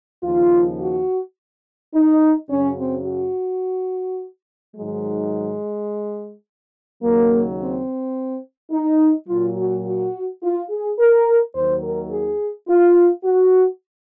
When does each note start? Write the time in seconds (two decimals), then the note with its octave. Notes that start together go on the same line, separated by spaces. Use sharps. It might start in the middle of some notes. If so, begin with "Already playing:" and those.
0.23 D#2 C#3 F3 F4
0.80 F#4
1.93 D#4
2.49 F#2 C#3 F#3 C#4
2.78 C4
3.06 F#4
4.75 G#2 D#3 F#3 G#3
7.02 D#2 C#3 F#3 A#3
7.59 C4
8.72 D#4
9.28 A#2 F#3 F4
9.57 F#4
9.86 F#4
10.42 F4
10.70 G#4
10.98 A#4
11.55 D#2 D#3 F#3 C5
11.83 A#4
12.11 G#4
12.68 F4
13.25 F#4